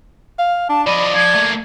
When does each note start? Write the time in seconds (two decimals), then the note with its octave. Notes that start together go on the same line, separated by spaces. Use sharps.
0.39 F5
0.69 D4 A5
0.87 F3 D5 D#5 B5
1.14 F3 G#6
1.34 A3 A#3